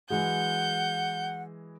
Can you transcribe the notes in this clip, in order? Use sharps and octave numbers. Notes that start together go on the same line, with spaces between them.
E3 F#3 G#3 F#5 G6